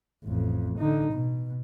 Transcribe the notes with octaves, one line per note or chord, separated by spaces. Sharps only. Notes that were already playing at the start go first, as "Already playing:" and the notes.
A1 F2
D3 D#4
B2